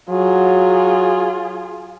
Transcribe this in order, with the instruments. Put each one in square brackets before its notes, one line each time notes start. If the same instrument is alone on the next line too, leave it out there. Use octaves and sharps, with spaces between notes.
[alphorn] F#3 [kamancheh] F4 G#4